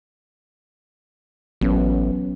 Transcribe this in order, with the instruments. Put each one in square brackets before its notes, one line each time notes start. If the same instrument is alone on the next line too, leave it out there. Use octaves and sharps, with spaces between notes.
[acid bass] A1 [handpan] F#3 B3 C#4